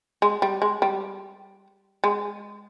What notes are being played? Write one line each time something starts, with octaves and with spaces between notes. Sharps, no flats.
G#3
G3
G#3
G3
G#3